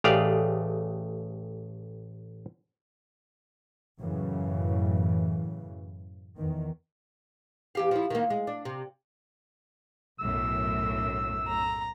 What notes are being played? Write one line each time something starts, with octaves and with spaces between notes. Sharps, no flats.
A1 A3 G4 G#4 D5 F5
F#2 A2 C#3 E3
E2 D#3
E2 G4 F5
F3 E4
D#3 A#3
G#3
D4
C3
B1 F#2 A2 E6
A#5